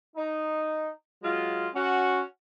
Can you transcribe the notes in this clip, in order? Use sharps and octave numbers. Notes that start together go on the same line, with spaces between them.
D#4
F#3 G#3 F4
C#4 F#4